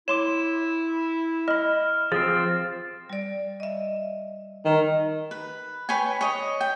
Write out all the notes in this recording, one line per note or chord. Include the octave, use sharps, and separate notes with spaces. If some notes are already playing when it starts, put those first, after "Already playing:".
E4 C#5 C6 D6 E7
D#5 B5 F6
F3 C4 G#4 A6
G3 D5
D#5 E5
D#3
B4
B4 C#5 G5 G#5
C#5 D#5
G5